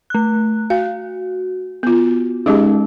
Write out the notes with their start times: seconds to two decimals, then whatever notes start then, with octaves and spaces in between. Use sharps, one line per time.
0.10 A3 F#6
0.70 F#4 F5
1.83 B3 F4
2.46 G#3 C#4 D#4 G4 G#4 D#5